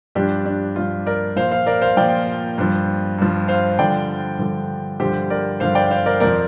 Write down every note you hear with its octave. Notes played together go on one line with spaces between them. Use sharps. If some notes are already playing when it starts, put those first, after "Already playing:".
G2 F3 D4 G4
D4
G2 F3 F4
A#4 D5
A#2 F3 C5 F5
C5 F5
A#4 D5
C5 F5
A#2 F3 D5 G5
G2 F3
G2 F3
C5 F5
G2 D3 F3 D5 G5
G2 D3 F3
G2 D3 F3 G4 C5
A#4 D5
G2 D3 F3 C5 F5
D5 G5
C5 F5
A#4 D5
F2 F3 A#4 D5